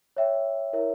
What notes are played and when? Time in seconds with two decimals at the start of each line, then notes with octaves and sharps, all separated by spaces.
0.17 C#5 E5 G5
0.73 E4 A#4 C#5 E5